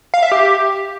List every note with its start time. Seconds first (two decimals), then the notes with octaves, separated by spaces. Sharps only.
0.14 F5
0.23 E5
0.32 G4